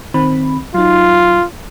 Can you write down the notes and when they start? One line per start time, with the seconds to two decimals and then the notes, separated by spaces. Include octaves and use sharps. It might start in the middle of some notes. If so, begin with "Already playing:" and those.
0.14 D#3 C4 B5
0.74 F#3 D#4 F4